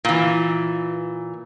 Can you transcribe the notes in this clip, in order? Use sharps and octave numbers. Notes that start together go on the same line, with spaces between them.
A#2 E3